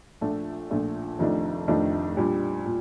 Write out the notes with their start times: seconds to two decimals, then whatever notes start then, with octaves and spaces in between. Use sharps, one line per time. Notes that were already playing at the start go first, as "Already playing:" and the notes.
0.21 A#1 A#2 A3 D4
0.70 A#1 A#2 A3 D4
1.19 F1 F2 D#3 A3 D4
1.68 F1 F2 D#3 A3 D4
2.17 A#2 G3 D4
2.66 A#2